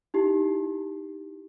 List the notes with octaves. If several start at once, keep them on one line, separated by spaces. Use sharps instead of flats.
D#4 E4 G4